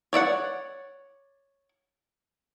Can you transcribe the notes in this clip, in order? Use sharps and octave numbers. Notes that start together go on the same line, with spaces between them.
C#5 D5 E5 F#5